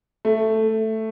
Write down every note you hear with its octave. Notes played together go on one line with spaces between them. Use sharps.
A3